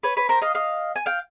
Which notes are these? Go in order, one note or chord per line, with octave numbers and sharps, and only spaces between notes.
B4 C#5
B4 C#5
A#4 C5
D#5 F5
D#5 F5
G#5
F5 G5